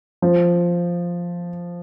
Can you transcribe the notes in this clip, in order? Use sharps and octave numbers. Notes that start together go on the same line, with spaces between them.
F3